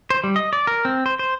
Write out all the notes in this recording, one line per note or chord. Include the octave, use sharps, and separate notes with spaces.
C5
G3
D#5
D5
A#4
C4
C5
C5